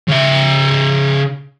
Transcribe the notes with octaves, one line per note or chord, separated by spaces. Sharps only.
C#3 E5